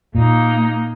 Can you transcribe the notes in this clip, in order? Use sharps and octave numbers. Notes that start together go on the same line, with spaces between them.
A#2 A#3 D#4